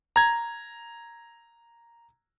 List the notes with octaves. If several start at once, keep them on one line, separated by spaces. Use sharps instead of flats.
A#5 G#6